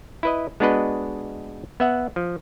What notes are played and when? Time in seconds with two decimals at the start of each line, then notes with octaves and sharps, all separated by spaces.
0.23 E4 B4 D#5
0.60 G#3 B3 D4 F#4 B4 D#5
1.80 B3 E5 F#5
2.16 F3